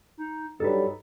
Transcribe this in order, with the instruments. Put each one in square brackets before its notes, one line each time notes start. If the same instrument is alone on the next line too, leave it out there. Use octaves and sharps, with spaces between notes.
[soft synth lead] D#4
[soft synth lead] G2 [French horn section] F#3 G3 D#4 [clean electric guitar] A4 B4